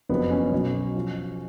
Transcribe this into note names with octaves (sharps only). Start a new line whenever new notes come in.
F#1 F2 F3 B3
C#4
B1 B2 F#3
F3